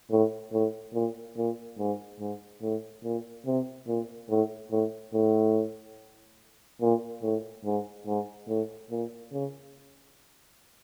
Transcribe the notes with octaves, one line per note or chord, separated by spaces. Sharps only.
A2
A2
A#2
A#2
G#2
G#2
A2
A#2
C3
A#2
A2
A2
A2
A#2
A2
G#2
G#2
A2
A#2
C#3